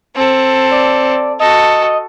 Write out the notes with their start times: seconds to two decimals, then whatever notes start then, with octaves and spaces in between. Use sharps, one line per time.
0.15 C4 A4
0.71 D5
1.40 F#4 A4 D#5